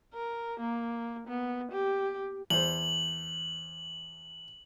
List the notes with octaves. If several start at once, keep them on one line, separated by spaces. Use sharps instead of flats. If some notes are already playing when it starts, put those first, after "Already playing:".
A#4
A#3
B3
G4
E2 C5 F#7